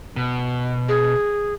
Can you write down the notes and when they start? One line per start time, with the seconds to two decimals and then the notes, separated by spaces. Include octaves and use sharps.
0.16 B2
0.89 G#4